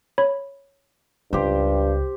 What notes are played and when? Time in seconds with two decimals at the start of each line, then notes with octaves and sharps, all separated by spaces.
0.18 C#5 B5
1.33 C#2 G2 G4 C5